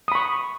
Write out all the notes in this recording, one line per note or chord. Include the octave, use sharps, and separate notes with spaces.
B5 C#6 D#6